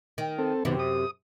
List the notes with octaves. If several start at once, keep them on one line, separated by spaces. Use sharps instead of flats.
D#3
C4 A4
F#2 C3 D#3 B3
D#6